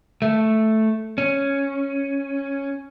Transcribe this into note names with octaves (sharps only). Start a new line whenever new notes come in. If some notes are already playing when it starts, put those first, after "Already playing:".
A3
C#4